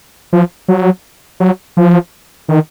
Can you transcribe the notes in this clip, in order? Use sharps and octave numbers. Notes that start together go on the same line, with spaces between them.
F3
F#3
F#3
F3
D#3